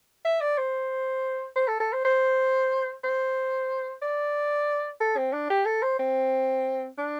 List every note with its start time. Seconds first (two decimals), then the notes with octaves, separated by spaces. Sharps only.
0.25 E5
0.41 D5
0.58 C5
1.56 C5
1.68 A4
1.80 A4
1.93 C5
2.05 C5
3.04 C5
4.02 D5
5.01 A4
5.17 C4
5.33 D4
5.50 G4
5.66 A4
5.83 C5
5.99 C4
6.98 D4